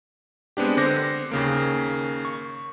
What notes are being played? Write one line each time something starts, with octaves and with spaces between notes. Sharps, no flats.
G#3 B3 C4 D4 G4
D3 C5 D6 A#6
D#2 C#3 A#3
C#6